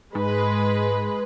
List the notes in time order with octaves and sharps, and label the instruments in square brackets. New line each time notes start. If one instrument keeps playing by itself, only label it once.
[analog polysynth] G#2 [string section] G#3 B4